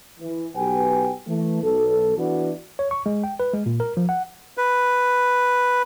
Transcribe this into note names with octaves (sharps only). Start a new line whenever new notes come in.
E3
B1 B3 G4 B4 G5 G#5
E3 A3
B1 A4
E3 B3 D4 E4 F#4
C#5
C#6
G#3
G5
B4
G#3
A#2
A#4
F3
F#5
B4